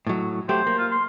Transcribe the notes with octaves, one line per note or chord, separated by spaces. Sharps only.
A2 F#3
F#3 A3 G4 C5
A#3
F4
C6